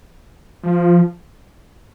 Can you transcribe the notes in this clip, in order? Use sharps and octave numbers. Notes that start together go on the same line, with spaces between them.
F3